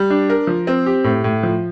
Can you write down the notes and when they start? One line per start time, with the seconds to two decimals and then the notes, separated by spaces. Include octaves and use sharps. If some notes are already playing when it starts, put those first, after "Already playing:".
Already playing: G3
0.10 D4
0.30 A#4
0.47 F3
0.67 C4
0.86 G4
1.04 A2
1.24 A2
1.43 F3